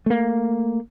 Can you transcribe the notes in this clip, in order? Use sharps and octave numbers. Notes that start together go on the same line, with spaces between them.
A3 A#3